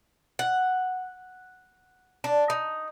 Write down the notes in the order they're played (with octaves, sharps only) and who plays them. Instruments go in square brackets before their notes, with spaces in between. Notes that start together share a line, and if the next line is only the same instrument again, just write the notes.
[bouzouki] F#5
D4
D#4